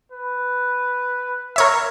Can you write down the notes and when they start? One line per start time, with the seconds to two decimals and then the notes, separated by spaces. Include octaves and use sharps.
0.12 B4
1.56 A#4 C#5 E5